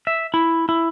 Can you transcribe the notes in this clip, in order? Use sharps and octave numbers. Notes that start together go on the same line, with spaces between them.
E5
E4
E4